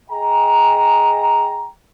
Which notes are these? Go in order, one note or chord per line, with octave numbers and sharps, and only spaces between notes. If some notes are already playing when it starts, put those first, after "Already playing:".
G#4 D#5 G5 G#5 A#5